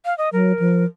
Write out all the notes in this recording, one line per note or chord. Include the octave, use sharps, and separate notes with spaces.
F5
D#5
F#3 A#4
F3